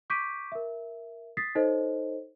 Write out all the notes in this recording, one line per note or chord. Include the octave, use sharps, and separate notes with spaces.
C#6 D6 G6 B6 D7 D#7
A#4 E5
D#6 A6 B6 C7
D#4 A4 C5 C#5 D#5